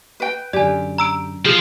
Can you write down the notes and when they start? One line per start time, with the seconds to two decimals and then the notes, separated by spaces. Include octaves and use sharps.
0.20 B4 G5
0.53 F#2 D3 G4 D5 G#5
0.98 A#5 E6 D7
1.45 F3 G#4